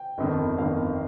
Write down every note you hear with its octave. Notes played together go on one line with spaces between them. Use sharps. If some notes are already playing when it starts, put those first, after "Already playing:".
Already playing: G5
G1 F2 D#3
G1 F2 D#3 F5